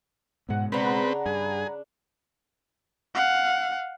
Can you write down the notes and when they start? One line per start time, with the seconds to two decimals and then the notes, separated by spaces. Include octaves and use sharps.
0.49 G#2 B2 G#3 F#5
0.72 C#3 C4 D4 B4 F#5 A#5 B5
1.26 G2 G#4
3.15 F5 F#5